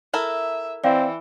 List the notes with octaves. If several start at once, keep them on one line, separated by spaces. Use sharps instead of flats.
E4 A4 A#4 E5
E3 C4 D5 F5 G5